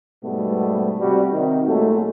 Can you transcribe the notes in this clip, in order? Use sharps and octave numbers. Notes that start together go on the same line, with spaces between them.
G#2 B2 G3 A3 B3
C3 G3 F#4
C3 D#3
A#2 F#3 G#3 A3